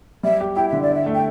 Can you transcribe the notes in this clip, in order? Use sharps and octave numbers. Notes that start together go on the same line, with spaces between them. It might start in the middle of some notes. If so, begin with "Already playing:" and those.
G3 E5
G4
E4 G5
D3 E5
D5
D4 E5
A3
G5